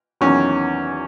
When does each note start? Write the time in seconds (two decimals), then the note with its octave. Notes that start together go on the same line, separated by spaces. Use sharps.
0.21 E2 D#3 F#3 C#4